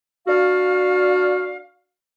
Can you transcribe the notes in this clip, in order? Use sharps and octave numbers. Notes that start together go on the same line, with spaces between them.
D4 F#4 F5